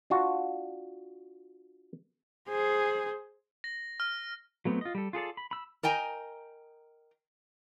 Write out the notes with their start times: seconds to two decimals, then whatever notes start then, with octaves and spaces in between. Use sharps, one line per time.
0.10 D4 F4 F#4
2.49 G#4 C5
3.64 A#6
4.00 F6
4.65 F#3 A3 B3 C4
4.81 F4 D#5
4.95 G3 A4
5.13 F4 G#4 A4 D5
5.37 B5
5.51 B5 E6
5.83 A#4 D#5 G5 G#5 A#5